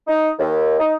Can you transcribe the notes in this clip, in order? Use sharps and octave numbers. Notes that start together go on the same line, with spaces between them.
D#4
D#2
D#4